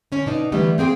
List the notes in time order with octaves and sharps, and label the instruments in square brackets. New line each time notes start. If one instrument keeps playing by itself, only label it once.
[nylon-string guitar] D3 C#4
B2 D4 D#4
D3 E3 G3 A3 B3
A#3 C4 G#4 G5